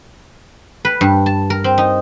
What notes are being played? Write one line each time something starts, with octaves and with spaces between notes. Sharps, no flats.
B4
G2
A5
A#4
C4
D#4